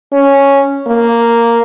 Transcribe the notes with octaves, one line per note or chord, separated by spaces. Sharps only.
C#4
A#3